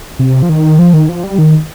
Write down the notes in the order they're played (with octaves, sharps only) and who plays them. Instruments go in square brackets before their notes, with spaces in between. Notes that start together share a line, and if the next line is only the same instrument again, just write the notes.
[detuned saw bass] C3
F3
D#3
F3
D#3
F3
G3
D#3